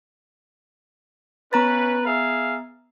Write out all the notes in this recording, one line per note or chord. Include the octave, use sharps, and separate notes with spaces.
B3 C#4 B4 A#5 A6
G#4 E5 F5